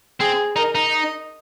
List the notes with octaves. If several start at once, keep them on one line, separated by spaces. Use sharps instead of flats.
C4 G#4
D#4 A#4
D#4
D#5